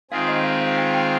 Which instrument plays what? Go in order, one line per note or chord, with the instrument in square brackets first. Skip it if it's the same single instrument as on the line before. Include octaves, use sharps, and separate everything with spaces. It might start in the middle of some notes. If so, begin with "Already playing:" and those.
[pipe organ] D#3 G#3 C4 F4 G#4 [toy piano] F5
[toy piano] D#5
F5
F5
G5
G5